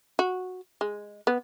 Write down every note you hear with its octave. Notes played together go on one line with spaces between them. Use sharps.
F#4
G#3
B3